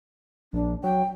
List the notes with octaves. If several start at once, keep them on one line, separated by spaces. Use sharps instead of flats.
A#1 D4
F#3 G5